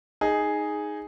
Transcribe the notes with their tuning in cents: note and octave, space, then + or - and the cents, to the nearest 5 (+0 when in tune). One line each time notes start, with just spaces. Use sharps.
D#4 +0 G#4 +0